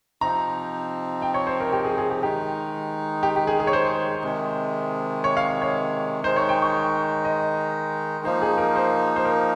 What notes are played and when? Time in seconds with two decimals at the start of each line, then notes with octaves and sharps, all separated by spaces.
0.21 C3 F3 C4 D#4 A#5
1.22 G5
1.34 C#5
1.47 C5
1.60 A#4
1.73 G4
1.85 G#4
1.98 G#4
2.11 G4
2.22 D#3 G#3 D#4 G4
3.23 G4
3.36 G4
3.47 G#4
3.60 G#4
3.67 C#5
3.73 C5
4.23 C3 D#3 G#3
5.24 C#5
5.37 F5
5.62 C#5
6.24 D#3 G#3 D#4 C5
6.36 C#5
6.49 G5
6.62 C#6
7.25 D#5
8.25 F3 A#3 D#4 C5
8.42 G#4
8.58 A#4
8.76 C5
9.16 C5
9.25 A#4